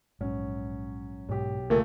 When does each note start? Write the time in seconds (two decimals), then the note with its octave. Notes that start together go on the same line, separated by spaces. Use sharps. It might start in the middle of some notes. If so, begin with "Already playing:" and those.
0.21 A#1 G#2 F#3 C#4
1.29 B1 G#2 G4
1.70 C2 A#2 C#3 F3 A3 A#3